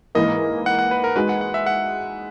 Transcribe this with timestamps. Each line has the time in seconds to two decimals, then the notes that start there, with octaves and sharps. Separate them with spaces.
0.15 G#2 E3 A#3 E4 A#4 D#5
0.66 F#5
0.79 F#5
0.91 B4
1.04 A#4
1.16 G#3 D#4 F#4 B4
1.29 F#5
1.41 F#5
1.54 E5
1.66 F#5